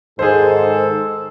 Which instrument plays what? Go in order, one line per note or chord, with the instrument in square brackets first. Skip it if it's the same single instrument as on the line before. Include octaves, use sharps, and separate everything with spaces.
[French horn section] G#2 D#3 [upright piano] G#4 C5 [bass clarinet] A4